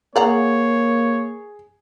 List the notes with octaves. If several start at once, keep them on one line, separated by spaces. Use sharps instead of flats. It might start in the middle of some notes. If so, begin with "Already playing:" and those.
A#3 G#4 C#5 D5 F#5 A#5